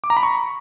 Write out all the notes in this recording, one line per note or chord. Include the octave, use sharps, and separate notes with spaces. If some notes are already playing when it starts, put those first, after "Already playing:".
D6
A#5
B5
C#6